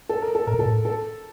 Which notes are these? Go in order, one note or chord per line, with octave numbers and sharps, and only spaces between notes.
A4
A#4
A4
A2 A#4
A#2
A2 A4
A4